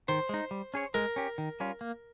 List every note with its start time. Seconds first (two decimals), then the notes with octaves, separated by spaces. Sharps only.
0.08 D#3 C5
0.29 G#3 D#4
0.51 G3
0.74 C#4 G#4 C#5
0.94 G#3 A#4
1.16 C#4 G4
1.38 D#3
1.60 G3 C#4 F4
1.81 A#3